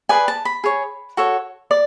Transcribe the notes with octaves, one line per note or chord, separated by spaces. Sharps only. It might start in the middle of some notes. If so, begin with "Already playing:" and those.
G#4 B4 D5 G#5
A5
B5
G#4 C#5
F#4 A4 C#5
D5